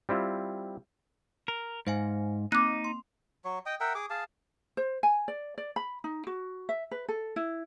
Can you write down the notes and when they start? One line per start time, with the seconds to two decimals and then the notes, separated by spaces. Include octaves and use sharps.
0.09 G3 C4 E4 F4
1.48 A#4
1.87 G#2 C5 F5 G#5
2.52 A#3 C4 D#4 D6 F#6
2.84 C6
3.45 F#3 C#5
3.66 D#5 G5
3.80 A#4 E5 F#5 G5
3.95 G#4 D6
4.10 G#4 F5 A5
4.77 C5
5.03 G#5
5.28 D5
5.58 D5
5.76 B5
6.04 D#4
6.27 F#4
6.69 E5
6.91 B4
7.08 A4
7.36 E4